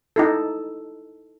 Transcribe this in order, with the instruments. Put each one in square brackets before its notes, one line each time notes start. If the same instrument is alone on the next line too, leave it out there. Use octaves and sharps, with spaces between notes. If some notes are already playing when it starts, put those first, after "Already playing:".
[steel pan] D#4 E4 A4